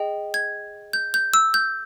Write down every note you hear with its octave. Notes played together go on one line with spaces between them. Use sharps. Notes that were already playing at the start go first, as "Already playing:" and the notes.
Already playing: G#4 D#5 G5
G#6
G6
G6
E6
G6